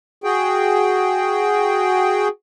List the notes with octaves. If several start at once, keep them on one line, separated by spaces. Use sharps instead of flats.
F#4 G#4 G5